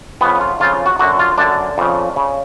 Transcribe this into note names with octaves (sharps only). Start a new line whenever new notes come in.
F2 C#3 B3
F4
F2 C#3 F4
F#4
F#2 D3 F#4
F4
F#2 D3 D4
F2 C#3
C#3